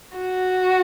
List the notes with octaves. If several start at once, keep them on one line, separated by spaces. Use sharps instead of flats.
F#4